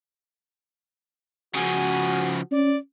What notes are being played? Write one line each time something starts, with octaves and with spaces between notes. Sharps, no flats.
C#3 F3 F#4 G#5
C#4 D5